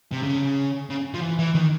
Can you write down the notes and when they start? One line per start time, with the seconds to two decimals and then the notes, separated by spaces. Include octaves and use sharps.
0.13 C3
0.24 C#3
0.90 C#3
1.14 F3
1.22 E3
1.39 E3
1.55 D#3